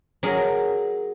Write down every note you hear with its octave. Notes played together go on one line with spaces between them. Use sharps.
F#3 G#4 A#4